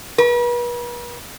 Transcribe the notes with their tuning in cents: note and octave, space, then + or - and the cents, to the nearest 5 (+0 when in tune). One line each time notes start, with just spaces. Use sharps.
B4 -40